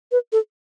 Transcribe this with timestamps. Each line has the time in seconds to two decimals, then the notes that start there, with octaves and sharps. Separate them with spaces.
0.12 B4
0.32 A4